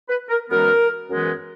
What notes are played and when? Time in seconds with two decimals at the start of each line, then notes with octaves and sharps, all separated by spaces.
0.09 B4
0.30 A#4
0.50 F#2 E3 G#3 B3 A#4
1.10 F#2 E3 G#3 B3